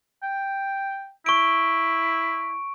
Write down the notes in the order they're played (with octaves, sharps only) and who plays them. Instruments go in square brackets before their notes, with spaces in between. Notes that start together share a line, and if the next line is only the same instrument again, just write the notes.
[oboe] G5
[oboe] E4 [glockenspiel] C#6 D7